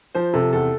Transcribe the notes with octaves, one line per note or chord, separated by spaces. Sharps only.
F3 C5
C3 A4
E2 A4